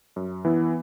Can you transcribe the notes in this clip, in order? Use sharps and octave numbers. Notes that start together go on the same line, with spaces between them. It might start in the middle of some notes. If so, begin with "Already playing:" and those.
F#2
E3 B3 E4